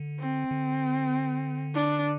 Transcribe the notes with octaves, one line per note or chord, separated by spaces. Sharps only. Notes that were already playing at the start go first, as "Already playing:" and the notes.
Already playing: D3
C4
D3
D4